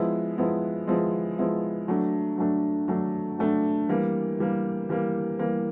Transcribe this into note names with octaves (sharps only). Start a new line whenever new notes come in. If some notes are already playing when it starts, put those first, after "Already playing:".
Already playing: F3 G#3 B3 E4
F3 G#3 B3 E4
F3 G#3 B3 E4
F3 G#3 B3 E4
F#3 A3 D4
F#3 A3 D4
F#3 A3 D4
F#3 A3 D4
E3 G3 A#3
E3 G3 A#3
E3 G3 A#3
E3 G3 A#3